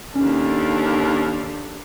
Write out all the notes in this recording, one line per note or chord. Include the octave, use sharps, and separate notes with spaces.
D#2 C#4 D4 A4